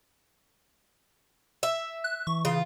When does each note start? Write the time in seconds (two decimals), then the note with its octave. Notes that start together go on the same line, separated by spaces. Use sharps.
1.63 E5
2.04 F#6
2.27 E3 C#6
2.45 C#3 F4